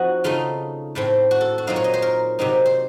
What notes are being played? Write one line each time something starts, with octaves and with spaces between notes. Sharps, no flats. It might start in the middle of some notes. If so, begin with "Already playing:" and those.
Already playing: F3 C4 D#4 F#4 D#5
C#3 A3 D#4 F4
A2 A3 C4
F#4
A4
F#4
A#2 F#3 C4 D#4 F5
C#5
D#5
C5
A#4
C3 F#3 C4 D#4
C5